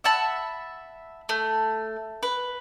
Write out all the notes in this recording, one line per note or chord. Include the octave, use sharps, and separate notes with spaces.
E5 F#5 A5 B5
A3
B4